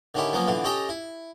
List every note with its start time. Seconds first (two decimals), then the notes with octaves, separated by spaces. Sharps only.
0.15 D3 D#3 C#4 E4 G4
0.33 F3 F#3 A#3 B3 C#4
0.47 B2 D3 E3 F4
0.64 C#4 G4 A4 D#5 G5 A#5
0.89 E4